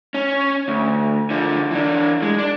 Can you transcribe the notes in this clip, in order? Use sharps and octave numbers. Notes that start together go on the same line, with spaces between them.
C#4
D2
D3 F3
E3 D4
G#3
D4